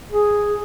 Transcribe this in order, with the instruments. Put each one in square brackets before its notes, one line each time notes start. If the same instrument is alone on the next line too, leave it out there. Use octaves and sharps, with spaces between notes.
[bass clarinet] G#4